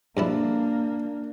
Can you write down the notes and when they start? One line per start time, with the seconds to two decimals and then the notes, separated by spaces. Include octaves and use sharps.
0.17 G2 F3 A#3 D4 E4